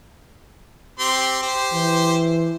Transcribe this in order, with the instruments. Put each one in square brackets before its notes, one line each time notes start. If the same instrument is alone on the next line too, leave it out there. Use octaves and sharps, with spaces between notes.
[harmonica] C4 G4 C6
G4 C5
[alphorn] E3